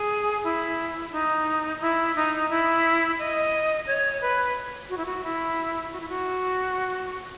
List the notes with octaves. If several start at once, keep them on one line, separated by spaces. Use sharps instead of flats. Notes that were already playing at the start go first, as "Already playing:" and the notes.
Already playing: G#4
E4
D#4
E4
D#4
E4
D#5
C#5
B4
F#4
E4
F#4
E4
F#4
E4
F#4